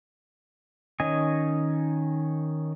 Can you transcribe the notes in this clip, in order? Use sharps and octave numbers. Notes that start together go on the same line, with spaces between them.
D#3 C#4 D#5 G#5